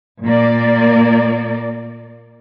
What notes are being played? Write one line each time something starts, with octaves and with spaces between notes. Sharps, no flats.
A#2 A#3 D5